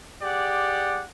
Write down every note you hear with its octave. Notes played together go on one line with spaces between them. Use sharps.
G4 G#4 D5 F#5